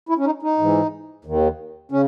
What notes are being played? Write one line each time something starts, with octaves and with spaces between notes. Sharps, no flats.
E4
C#4
D#4
D#4
G#2 E3
D#2 D#3
C#3 C#4